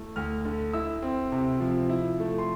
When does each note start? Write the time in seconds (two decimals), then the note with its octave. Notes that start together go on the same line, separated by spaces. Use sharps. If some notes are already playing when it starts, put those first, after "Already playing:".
Already playing: A3 E4
0.16 D2 F6
0.45 D3
0.73 E4 E6
1.03 C4
1.32 C3
1.60 F3
1.90 E4
2.20 A3
2.38 C6